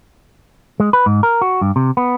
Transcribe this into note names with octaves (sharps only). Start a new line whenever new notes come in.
G#3
B4
G#2
A#4
F#4
G2
C3
B3